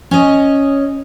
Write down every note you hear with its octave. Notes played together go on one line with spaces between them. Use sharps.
C#4 C#5 D#5